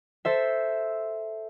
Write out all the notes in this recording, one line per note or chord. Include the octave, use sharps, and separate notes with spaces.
A4 C5 E5